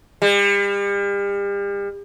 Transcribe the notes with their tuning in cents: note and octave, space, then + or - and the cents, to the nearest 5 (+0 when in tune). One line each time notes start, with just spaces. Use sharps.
G3 +40